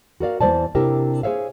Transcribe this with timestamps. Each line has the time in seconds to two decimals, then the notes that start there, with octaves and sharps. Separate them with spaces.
0.20 F#4 A#4 D5 F5
0.41 E2 E3 G#3 C5 D5 A5
0.75 C3 D4 E4 G4 A#4 E5
1.23 G#4 C5 C#5 E5 F5